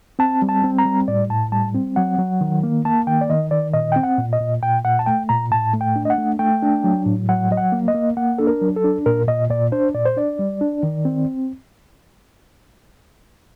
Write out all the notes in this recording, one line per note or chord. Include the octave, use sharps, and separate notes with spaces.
C4 A5
G3
A5
C4
A#5
G3
A2 D5
A2 A5
G3 A5
C4
F#3 F#5
F#3
D#3
A#3
A#3 A5
D#3 G5
D5
D#3 D#5
D#3 D5
A#2 D#5
C4 G5
F#5
A#2
D#5
A#2
A#2 G5
A#2 F#5
A5
A3 G5
A#2 A#5
A2 A5
A3
G5
D4
D#5
F#5
A3
A3 G5
D4
F#3
A2
F#3 F#5
F#3 D#5
F#5
A#3
D#5
A#3
A#3 F#5
D4 A4
A#4
F#3
A4
D4
A#2 A#4
A#2 D#5
A#2 D5
D4 C5
A#2 D5
C5
D4 D5
G3
D4
D#3
C4